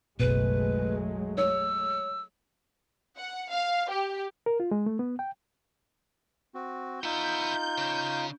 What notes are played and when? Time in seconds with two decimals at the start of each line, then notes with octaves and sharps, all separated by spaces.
0.20 F#1 B1 B2 F#3 G#3 A3 B4
1.38 C#5 E6
3.18 F#5
3.50 F5
3.89 G4
4.46 A#4
4.60 F4
4.71 G#3
4.86 A3
4.99 B3
5.19 G5
6.55 C4 F#4
7.03 B3 D#4 F4 E5 G6
7.78 C#3